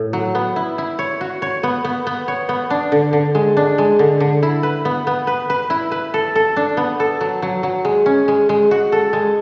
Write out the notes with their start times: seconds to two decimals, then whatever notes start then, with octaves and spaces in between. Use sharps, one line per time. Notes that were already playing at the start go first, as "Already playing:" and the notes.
Already playing: A2
0.13 F#3
0.35 B3
0.56 E4
0.78 E4
0.99 C#5
1.21 F#4
1.42 C#5
1.63 B3
1.85 B3
2.07 B3
2.28 C#5
2.49 B3
2.70 D4
2.92 D3
3.13 D3
3.35 G#3
3.57 D4
3.78 G#3
3.99 D3
4.20 D3
4.43 E4
4.63 B4
4.85 B3
5.07 B3
5.27 B4
5.50 B4
5.70 E4
5.92 B4
6.14 A4
6.35 A4
6.56 D4
6.77 B3
7.00 A4
7.21 F#3
7.42 F#3
7.63 F#3
7.85 G#3
8.06 C#4
8.28 G#3
8.49 G#3
8.71 F#4
8.92 A4
9.13 G#3